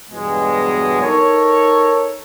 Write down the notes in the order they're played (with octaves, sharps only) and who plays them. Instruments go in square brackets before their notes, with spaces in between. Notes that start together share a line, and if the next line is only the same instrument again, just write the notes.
[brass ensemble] E2 G2 B2 F#3 G#3
D#4 A4 A#4 C#5